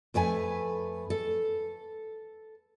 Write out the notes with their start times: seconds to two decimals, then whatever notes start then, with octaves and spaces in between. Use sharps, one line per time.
0.14 F2 A3 B4 G#5
1.10 A4